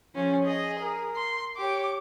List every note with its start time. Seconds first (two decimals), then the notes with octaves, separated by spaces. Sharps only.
0.14 F3 C#4 G#4
0.44 G#4 D#5
0.81 A#4
1.16 C6
1.57 G4 C#5 D6